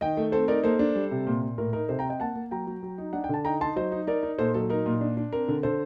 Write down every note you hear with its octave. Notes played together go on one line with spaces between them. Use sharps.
D#3 D#5 G5
A3
C4 A4 C5
D#4 A#4 D5
A#3 A4 C5
D4
G3
C3
A#2
A#2
A2 A#4
D#4 A#4
C3 A4 C5
G5 A#5
C4
D#5 G5
A#3 F#5 A5
A#3
F#3 G5 A#5
F#3
F#3
D#4
D4 F#5
G5
D3 A5
D#4 G5 A#5
D#4 A5 C6
F#3 C5 D#5
D#4
D#4 A#4 D5
D#4
A#2 A4 C5
F#3 A4
D#4 A#4
A#2
D4
D4
C4 A#4
D3
D3 A4 C5